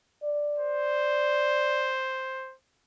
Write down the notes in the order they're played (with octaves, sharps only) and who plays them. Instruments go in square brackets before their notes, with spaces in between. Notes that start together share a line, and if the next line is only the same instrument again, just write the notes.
[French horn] D5
[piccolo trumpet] C5